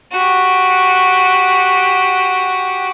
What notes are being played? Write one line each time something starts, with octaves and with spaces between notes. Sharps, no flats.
F#4 G4